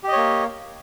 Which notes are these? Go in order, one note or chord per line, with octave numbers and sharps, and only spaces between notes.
A#3 G4 C#5 D#5